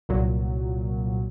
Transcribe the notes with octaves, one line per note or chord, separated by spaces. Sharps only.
C2 A#2 F#3